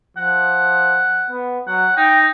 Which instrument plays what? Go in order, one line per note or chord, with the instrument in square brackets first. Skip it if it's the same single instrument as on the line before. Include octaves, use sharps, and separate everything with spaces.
[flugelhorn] F3 [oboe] F#5
[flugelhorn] B3
[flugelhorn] F#3 [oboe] F#5
[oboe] D#4 [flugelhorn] G5